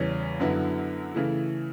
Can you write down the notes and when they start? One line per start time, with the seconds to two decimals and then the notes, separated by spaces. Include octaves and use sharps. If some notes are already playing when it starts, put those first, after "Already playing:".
Already playing: E2 C#3 E3 G3 C#4
0.40 F#2 D3 F#3 B3 E4
1.14 C#3 E3 A3 E4